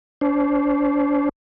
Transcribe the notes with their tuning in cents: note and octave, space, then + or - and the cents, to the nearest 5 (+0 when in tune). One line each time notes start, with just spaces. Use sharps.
D4 -35 C5 +0